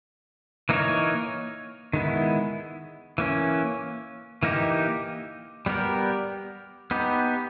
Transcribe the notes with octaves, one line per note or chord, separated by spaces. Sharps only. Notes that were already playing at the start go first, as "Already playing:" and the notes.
E3 A#3 D#4 A#4 C#5
D#3 G#3 B3 E4
E3 A#3 C#4
E3 A#3 D#4 G4
G3 B3 G4 A#4
B3 D#4 G4